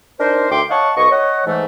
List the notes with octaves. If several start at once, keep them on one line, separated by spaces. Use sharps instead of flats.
D4 D#4 A#4 C5
D2 E5 G5 C6 D6
C#5 D#5 F5 F#5 A5 C#6
C2 B4 D#5 C#6
C#5 D#5 F#5
G#2 E3 A3